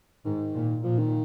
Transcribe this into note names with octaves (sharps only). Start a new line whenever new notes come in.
G#2 D#3
A#2
A#2 F3
D#3